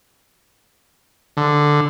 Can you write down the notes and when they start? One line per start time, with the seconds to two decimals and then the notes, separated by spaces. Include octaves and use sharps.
1.37 D3